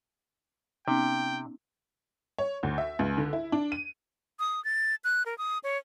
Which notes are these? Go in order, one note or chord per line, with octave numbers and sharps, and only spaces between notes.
C3 B3 C#4 D#4 G5
C#5
D2
E5
C#2
D3
E4
D4
D#7
D#6
A6
F#6
A#4
D#6
C#5